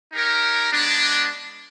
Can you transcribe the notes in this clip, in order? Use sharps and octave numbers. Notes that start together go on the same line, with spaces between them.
D#4 G4 A#4 C#5
G#3 B3 D4